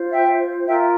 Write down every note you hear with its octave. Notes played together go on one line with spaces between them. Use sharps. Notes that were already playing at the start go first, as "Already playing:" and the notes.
Already playing: F4 C5
E5 G5
F4 A#4 E5 G5